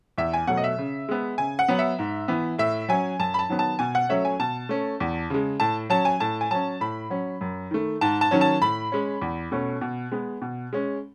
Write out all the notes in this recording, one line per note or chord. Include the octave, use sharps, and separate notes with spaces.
E2 E5
G#5
B2 F#3 A3 F#5
D#5
E5
C#3
G#3 B3
C#3 G#5
F#5
F#3 B3
E5
G#2
E3 B3
A2 E5
F#3 C#4 G#5
F#2 A5
B5
A5
D#3 F#3 B3
A5
B2 G#5
F#5
F#3 A3 C#4 E5
G#5
B2 A5
A3 C#4
E2
C#3 G#3
A2 A5
F#3 C#4 A5
G#5
A2 A5
G#5
F#3 C#4 A5
A2 B5
F#3 C#4
F#2
D#3 A3
G#2 A5
A5
D#3 F#3 C#4
A5
A2 B5
G#3 C#4
E2
B2 A3 C#4
B2
G#3 B3
B2
G#3 C#4